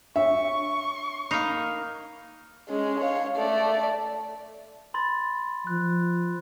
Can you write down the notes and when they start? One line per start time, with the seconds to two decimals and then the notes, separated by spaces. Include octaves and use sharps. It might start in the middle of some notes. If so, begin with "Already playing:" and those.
0.16 D4 C#5 E5 C#6
1.31 A#3 D#4 B5 C7 F7
2.69 G#3 C#4
3.00 C#5 F5
3.37 A3 D5
4.94 B5 C6 A6
5.67 F3 F#6